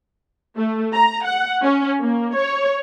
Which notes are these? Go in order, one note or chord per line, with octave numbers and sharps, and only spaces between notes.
A3
A#5
F#5
C#4
A#3
C#5